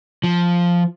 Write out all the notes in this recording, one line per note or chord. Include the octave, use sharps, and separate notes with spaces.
F3